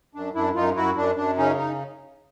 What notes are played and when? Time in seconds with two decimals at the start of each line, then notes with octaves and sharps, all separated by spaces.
0.15 F#2 D4
0.35 F#2 D4 E4
0.55 F#2 D#4 F4
0.76 F#2 E4 F#4
0.97 F#2 D4
1.17 F#2 D4
1.37 C#3 C#4 D#4
1.58 D#4